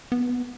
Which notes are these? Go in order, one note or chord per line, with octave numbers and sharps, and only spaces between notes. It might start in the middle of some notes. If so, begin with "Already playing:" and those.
B3